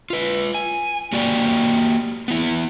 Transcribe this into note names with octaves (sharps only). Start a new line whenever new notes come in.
F4 B4
G#5
A#3 F#4 G4 D5
B3 E4